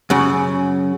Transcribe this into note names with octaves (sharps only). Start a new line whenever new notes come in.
F#2 C#3